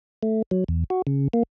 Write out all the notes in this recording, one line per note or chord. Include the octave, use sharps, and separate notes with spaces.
A3
F#3
E2
F#4
C#3
A#3